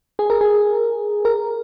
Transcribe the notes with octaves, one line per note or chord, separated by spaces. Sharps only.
G#4
A#4
G#4
A#4